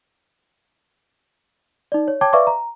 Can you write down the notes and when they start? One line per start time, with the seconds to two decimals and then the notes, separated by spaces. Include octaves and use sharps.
1.92 D#4 D5
2.08 C#5
2.21 C#5 G5 A5 D6 G#6
2.33 B4 D5 E5 F5 C#6 D6
2.47 A#5